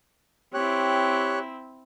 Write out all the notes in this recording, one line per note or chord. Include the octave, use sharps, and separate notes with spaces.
C4 E4 G4 C#5 F#6